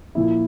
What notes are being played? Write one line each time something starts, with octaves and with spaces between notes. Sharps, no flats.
A#2 F3 A#3 E4